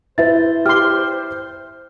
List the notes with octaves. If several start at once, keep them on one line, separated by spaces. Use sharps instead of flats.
E4 B4 C5 E5 A6
G4 C6 F6